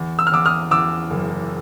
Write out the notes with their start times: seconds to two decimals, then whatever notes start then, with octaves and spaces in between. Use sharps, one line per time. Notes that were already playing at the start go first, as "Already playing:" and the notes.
Already playing: E2
0.19 E6
0.27 F6
0.32 E2 D6 E6
0.45 D#6 F6
0.71 E2 D6 E6
1.10 F#1